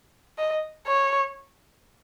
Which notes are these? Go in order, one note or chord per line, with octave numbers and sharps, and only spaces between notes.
D#5
C#5